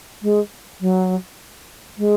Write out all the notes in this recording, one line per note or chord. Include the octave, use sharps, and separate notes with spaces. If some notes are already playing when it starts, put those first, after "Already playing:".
G#3
F#3
G#3